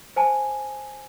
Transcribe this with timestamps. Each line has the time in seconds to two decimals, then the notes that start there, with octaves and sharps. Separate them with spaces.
0.16 C5 G#5 A5